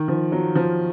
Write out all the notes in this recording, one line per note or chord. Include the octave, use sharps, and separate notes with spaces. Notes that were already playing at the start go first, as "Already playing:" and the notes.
Already playing: D#3
F3
F#3
F3